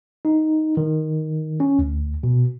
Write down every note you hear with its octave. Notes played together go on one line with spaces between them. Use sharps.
D#4
D#3
C#4
D2
B2